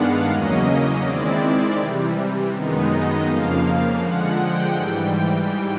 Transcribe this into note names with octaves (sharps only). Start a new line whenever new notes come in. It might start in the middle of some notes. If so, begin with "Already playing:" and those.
Already playing: G2 D#3 G#3 B3 D4 F5 F#5
E2 C#3 F#3 A#3 C#4 D#5
D#5
D#3 G#3 C4 E4 D5
C3 E3 G3
F#2 D#3 G#3 B3 D#4
D#5
F2 C#3 F3 A#3 F5
D3 F3 G#3 F#5
G5
G#2 E3 G3